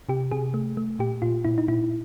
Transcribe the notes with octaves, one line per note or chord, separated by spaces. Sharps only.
C3 G4
C3 G#4
A3
A3
A#2 G4
A#2 F4
A#2 E4
D#4
A#2 E4